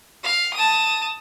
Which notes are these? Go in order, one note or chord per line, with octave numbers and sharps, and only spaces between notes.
F5
A5 D#6